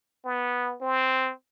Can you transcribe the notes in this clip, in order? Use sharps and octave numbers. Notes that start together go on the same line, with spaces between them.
B3
C4